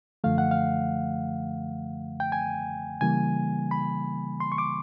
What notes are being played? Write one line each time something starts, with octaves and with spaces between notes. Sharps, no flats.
F#2 D3 F3 A3 F5
F#5
F5
G5
G#5
C#3 E3 G3 A#3 G#5
B5
C6
C#6
D6